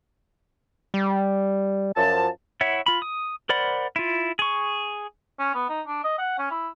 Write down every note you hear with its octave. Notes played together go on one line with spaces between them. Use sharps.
G3
F#2 F3 A5
E4 C#5 E5 F#5
F4 B5
D#6
A#4 C5 D5 F#5 B5
E4 F4
G#4 C#6
C#4
B3
D#4
D4
D#5
F#5
C#4
E4